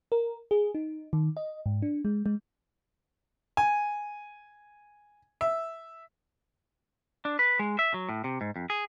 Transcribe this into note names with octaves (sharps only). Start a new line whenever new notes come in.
A#4
G#4
D#4
D#3
D#5
G#2
D4
G#3
G#3
G#5
E5
D4
B4
G#3
E5
F#3
A2
C3
G#2
F2
G#4